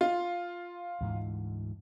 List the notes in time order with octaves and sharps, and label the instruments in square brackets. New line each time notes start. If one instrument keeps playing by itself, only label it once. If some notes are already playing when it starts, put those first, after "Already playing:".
[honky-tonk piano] F4
[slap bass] D2 G#2 E3